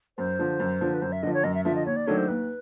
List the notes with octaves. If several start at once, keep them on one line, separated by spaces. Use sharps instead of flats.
F#2 C5
D3 F3
F#2
D3 F3
B4
F#2 C5
E5
D3 F3 D#5
C#5
F#2 D#5
E5
D3 F3 E5
D#5
D#2 C#5
D5
D#3 F#3 A3 D4 C#5
C5
D#2 B4